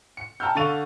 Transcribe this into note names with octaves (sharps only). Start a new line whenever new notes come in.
C#7
G5 A5 A#5 E6 F6 G6
D3 F5 C#6 A6 D#7 F7